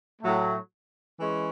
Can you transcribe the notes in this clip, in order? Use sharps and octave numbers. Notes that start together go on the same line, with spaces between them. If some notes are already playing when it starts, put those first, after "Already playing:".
A2 F#3 A3
E3 G#3 C#4